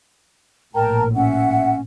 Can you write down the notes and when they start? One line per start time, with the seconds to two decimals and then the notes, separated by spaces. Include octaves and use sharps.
0.75 A#1 A2 A#4 G5 A5 A#5
1.15 C#4 E5 F#5